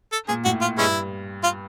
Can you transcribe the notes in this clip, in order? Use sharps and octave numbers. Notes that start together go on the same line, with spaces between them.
A4
A#2 G#4
A2 F#4
F4
G2 G#3 C#4 E4
F4